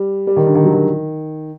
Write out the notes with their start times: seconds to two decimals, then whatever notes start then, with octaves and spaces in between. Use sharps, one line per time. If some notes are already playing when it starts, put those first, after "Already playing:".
Already playing: G3
0.27 G3
0.36 D#3
0.47 D3
0.55 D#3
0.65 F#3
0.73 D#3